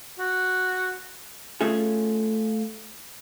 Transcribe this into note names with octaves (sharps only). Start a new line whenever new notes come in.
F#4
A3 C#4 F4 G#4